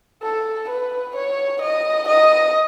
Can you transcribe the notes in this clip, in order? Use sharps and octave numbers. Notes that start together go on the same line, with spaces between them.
A4
B4
C#5
D#5
D#5